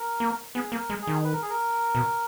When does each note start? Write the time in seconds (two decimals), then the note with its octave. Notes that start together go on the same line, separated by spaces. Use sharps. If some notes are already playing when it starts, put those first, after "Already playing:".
Already playing: A#4
0.20 A#3
0.55 B3 G#4
0.72 A#3
0.78 A#4
0.90 G#3
1.02 G#4
1.07 D#3
1.24 B4
1.33 A#4
1.42 G#4
1.50 A#4
1.95 B2